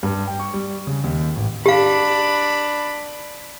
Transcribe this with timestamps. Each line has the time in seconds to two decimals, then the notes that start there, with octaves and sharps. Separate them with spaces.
0.03 G2
0.27 G5
0.39 C#6
0.54 G3
0.87 C#3
1.04 D#2
1.36 A1
1.66 D4 G4 F5 B5